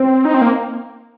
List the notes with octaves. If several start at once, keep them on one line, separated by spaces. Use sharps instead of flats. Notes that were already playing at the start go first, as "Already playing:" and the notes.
Already playing: C4
D#4
C4
A#3